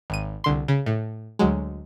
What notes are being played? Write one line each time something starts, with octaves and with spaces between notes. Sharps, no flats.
G#1 D#7
C2 D3 C6
C#3
A2
D2 F#3 G#3